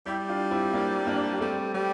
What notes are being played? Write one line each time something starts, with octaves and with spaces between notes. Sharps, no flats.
G3 E4 G4
D4 F4
C4 E4
A#3 D4
A#3 D4
G3 A3 C4
G3